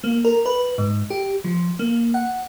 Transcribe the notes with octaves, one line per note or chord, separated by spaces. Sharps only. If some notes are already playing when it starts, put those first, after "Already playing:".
A#3
A#4
B4
G#2
G4
F3
A#3
F#5